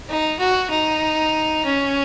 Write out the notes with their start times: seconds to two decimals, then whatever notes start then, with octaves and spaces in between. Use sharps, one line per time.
0.09 D#4
0.39 F#4
0.70 D#4
1.65 C#4